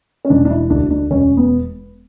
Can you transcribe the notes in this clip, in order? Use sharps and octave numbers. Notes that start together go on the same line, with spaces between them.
C#4
E1 D4
D4
E4
D2 D4
D4
E1 C#4
B3